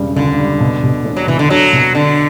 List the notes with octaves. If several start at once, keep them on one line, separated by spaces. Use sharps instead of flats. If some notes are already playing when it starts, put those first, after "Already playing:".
Already playing: E1 C#3 G3
C#2 D3
G3
B2
B2
E1
F#3
B2 E3
D3
F#3 A4
B2
D3 D4